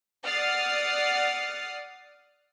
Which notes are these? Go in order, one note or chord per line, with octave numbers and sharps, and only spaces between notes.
D5 F#5 D#6 F6 A6 C7